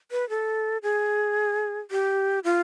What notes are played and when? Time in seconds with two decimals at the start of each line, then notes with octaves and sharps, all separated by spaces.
0.12 B4
0.29 A4
0.83 G#4
1.91 G4
2.44 F4